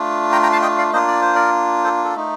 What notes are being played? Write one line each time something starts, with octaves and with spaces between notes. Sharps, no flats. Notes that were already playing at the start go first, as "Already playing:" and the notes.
Already playing: A3 D4 F4
G5 A#5
G5 A#5
F5 A5
D#5 G5
D5 F5
A#3 D4 F4 C5 D#5
D5
C5
A#4 D5
A4 C5
A4
A3 D#4